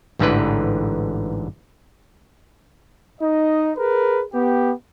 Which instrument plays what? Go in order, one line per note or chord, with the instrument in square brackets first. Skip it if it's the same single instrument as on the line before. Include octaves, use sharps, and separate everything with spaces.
[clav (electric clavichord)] A1 G#2 D3 E3 B4
[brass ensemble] D#4 D#5
G#4 A#4 B4
B3 G4